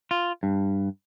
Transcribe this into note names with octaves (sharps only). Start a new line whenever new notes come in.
F4
G2